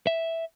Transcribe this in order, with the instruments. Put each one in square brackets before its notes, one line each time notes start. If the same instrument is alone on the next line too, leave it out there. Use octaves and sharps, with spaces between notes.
[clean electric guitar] E5